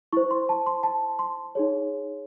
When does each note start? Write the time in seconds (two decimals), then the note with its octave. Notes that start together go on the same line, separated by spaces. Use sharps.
0.13 E4 C5 C#6
0.31 C6
0.49 A5
0.66 C6
0.83 A5
1.19 C6
1.55 D#4 G#4 C#5